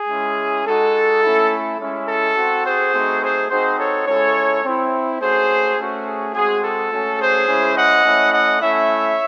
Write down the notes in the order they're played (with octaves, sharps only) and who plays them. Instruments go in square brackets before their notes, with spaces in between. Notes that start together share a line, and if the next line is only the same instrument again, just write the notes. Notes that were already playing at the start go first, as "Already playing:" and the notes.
Already playing: [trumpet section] G#4
G#3 C#4 E4
G#3 D#4 F#4 A4
A3 C#4 E4
G#3 C#4 E4
A4
C4 F#4
G#4 C5
A3 C4 D#4 F#4
G#4 C5
C4 D#4 F#4 G#4 C5
A4 C#5
G#3 C#4 E4 A4 C#5
C4 E4
A3 C#4 F#4 G#4 C5
A3 C#4 F#4
G#4
G#3 C4 F#4 G#4
A4
A3 C#4 F#4
G#4 C5
G#3 C#4 E4
D#5 F#5
A3 C#4 E4
D#5 F#5
A3 C#4 E4 C#5 E5